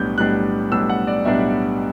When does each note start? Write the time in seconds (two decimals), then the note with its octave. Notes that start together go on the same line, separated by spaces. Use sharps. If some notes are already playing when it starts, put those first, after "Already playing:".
Already playing: B1 A2 G3 B3 D4 G6
0.17 B1 A2 G3 B3 D4 F#6
0.71 B1 A2 G3 B3 D4 E6
0.89 F#5
1.07 D5
1.25 B1 A2 G3 B3 D4 E5